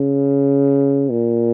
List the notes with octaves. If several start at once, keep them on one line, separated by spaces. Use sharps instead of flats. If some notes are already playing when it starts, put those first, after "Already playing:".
Already playing: C#3
A#2